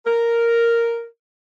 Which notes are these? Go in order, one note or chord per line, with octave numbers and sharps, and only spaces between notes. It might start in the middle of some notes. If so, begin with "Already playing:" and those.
A#4